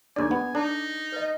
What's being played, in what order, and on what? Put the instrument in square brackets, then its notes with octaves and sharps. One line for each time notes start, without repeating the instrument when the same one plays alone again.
[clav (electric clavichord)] D#2 D5 [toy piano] D4 G#4 [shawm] G#5
[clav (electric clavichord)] B3
[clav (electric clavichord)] D4 [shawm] D#4 [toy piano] A4 A#5 D6
[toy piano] B4 D#5